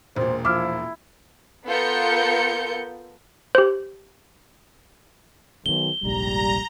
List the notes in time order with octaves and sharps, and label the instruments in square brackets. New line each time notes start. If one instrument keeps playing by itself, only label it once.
[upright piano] E1 A#2 [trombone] C5
[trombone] F3 [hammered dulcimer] E4 [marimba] D6 F6
[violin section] B3 F4 A4 A#4 G6 C#7
[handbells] G4 C5
[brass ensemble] B1 [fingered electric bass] D3 D#3 [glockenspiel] G7
[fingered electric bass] F1 A#1 G#2 [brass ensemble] G3 [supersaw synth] A#5